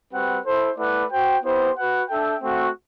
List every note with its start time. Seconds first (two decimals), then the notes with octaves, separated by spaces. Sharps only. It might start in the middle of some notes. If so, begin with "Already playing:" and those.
0.12 G3 C4 F#4 B4 F#5
0.45 E4 A4 C5
0.77 A3 E4 B4 D5 F#5
1.10 F#4 C5 G5
1.44 B3 E4 G4 C5
1.76 F#4 B4 F#5
2.09 D4 A4 E5 G5
2.42 A3 C4 F#4